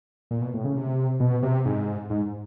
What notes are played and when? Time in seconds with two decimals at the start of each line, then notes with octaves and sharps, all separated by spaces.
0.31 A#2
0.42 B2
0.54 A2
0.64 C#3
0.75 C3
1.20 B2
1.43 C3
1.66 G#2
2.10 G#2